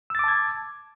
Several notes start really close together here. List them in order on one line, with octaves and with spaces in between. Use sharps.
E6 A6 D6 A5 G#6